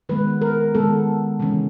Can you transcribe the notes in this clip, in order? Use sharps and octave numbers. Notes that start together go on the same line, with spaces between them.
D#3 G#3 B3 B4
A#4
D#3 G#3 B3 A4
C#3 E3 G#3 C#4